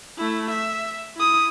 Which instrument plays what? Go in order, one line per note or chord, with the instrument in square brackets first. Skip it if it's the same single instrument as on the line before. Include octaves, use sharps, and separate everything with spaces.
[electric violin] A3 E4
E5
E4 D#6